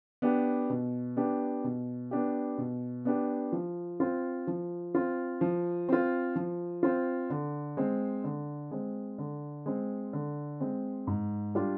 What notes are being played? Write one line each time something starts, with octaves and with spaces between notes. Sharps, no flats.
B3 D4 G4
B2
B3 D4 G4
B2
B3 D4 G4
B2
B3 D4 G4
F3
C4 F4
F3
C4 F4
F3
C4 F4
F3
C4 F4
D3
G#3 C4
D3
G#3 C4
D3
G#3 C4
D3
G#3 C4
G#2
G3 D4 F4